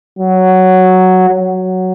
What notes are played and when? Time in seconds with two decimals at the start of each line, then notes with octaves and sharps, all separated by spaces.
0.19 F#3
1.30 F#3